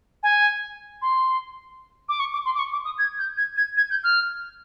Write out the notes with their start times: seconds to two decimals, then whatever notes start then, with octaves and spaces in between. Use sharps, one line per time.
0.23 G#5
1.02 C6
2.09 D6
2.20 C#6
2.33 D6
2.45 C6
2.55 D6
2.59 C#6
2.72 D6
2.85 D#6
2.98 G#6
3.19 G6
3.37 G#6
3.57 G#6
3.77 G#6
3.90 G6
4.04 F6